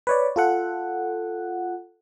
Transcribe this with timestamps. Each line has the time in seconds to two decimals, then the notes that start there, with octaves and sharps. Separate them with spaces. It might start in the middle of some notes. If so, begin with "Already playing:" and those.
0.07 B4 C#5 D5
0.36 F4 A4 F#5